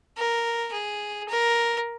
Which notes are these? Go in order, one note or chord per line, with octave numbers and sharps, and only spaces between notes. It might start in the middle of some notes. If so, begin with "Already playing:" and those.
A#4
G#4
A#4